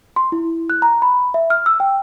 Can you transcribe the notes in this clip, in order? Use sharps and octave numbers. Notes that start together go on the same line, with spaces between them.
C6
E4
F#6
A#5
B5
E5
F6
E6
G5